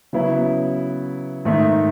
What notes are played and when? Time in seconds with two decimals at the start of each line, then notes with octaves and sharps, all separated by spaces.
0.13 C#3 F#3 B3 E4
1.45 G#2 D#3 A3 D#4